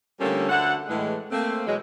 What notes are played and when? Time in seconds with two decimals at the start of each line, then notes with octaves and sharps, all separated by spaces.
0.20 D3 F3 G3 A3 A#3 C#4
0.49 D2 D3 A3 A4 F#5
0.88 A2 E3 G#3
1.31 A3 A#3 C4
1.66 B2 E3 F#3 G#3